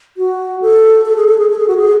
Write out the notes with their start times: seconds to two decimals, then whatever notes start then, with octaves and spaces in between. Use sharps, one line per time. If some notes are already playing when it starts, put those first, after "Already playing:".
0.17 F#4
0.62 A4
1.06 A4
1.16 G#4
1.27 A4
1.38 G#4
1.50 A4
1.58 G#4
1.67 F#4
1.77 G#4